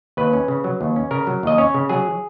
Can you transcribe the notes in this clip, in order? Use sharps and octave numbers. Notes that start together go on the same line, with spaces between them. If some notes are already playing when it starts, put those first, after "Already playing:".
D#2 B4
C#4
C#3
F#3
D#2
C#4
C#3 A#4
F#3
D#2 D#5
C#4 C#5
C#3
F#3 G#4